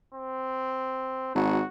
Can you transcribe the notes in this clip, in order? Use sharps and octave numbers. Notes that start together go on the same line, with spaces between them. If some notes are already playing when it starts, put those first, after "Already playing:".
C4
G#1 F#4